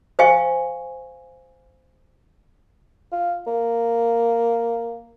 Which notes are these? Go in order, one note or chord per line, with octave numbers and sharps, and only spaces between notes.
C5 D#5 F5 G#5 C#6
F4
A#3